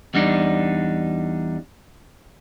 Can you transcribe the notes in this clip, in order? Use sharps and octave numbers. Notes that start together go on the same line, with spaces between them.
E2 G3 D4 D#4